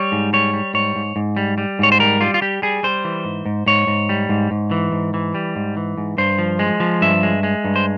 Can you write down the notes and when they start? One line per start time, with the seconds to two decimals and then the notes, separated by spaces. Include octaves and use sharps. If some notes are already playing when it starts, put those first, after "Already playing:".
Already playing: G3 C#5
0.12 G#2
0.33 G3 C#5
0.53 G3
0.74 G#2 C#5
0.96 G#2
1.16 G#2
1.37 G3
1.58 G3
1.79 G#2 C#5
1.92 C5
1.99 G3 A#4
2.21 G3 F4
2.34 F4
2.41 G3 G4
2.62 G3 G#4
2.83 G3 C5
3.05 E3
3.25 G#2
3.46 G#2
3.66 G#2 C#5
3.87 G#2
4.09 G3
4.29 G#2
4.51 G#2
4.71 E3
4.92 G#2
5.14 E3
5.35 G3
5.56 G#2
5.77 E3
5.98 G#2
6.18 G2 C5
6.39 F3
6.59 G#3
6.80 F3
7.01 G2 E5
7.23 G#3
7.43 G#3
7.64 G2
7.76 C5